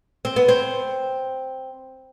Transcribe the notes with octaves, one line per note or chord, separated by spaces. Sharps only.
C4
B3
C4